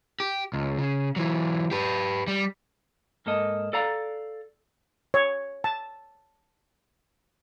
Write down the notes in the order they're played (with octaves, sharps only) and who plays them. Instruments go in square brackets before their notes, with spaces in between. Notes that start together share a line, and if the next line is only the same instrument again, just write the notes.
[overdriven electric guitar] G4
C#2
C#3
E3 F#3
G4 B4
G3
[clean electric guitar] G#2 A#3 A4 D#5
A4 D5 F5 A#5
[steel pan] C#5
A5